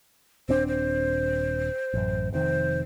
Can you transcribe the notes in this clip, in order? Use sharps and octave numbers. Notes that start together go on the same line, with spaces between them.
D#1 C4 D4 C5
C5
A1 F#2
F1 C3 D#3 C5